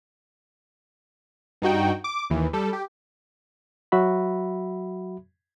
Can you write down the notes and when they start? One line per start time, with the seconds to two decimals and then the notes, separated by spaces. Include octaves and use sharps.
1.62 G2 D#4 F#4 G5
2.04 D6
2.30 D#2 E3
2.53 G3 A4
2.73 G4
3.92 F#3 F#4 E5 B5